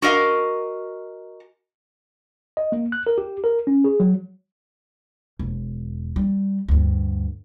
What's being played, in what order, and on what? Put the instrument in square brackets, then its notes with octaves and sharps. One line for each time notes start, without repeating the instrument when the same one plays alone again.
[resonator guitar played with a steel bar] F#4 A#4 D#5 F5
[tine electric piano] D#5
A#3
F#6
A#4
G4
A#4
C#4
G#4
F#3
[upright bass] E1
G3
D2 G2